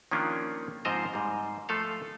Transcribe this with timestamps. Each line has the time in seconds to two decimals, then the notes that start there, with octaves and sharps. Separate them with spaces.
0.11 D#3 F3 A#3 C#4 D4 F4
0.85 G#2 F3 C4 C5 D#5 A#5
1.13 G#2 G3
1.69 F3 A3 F4 A4 F5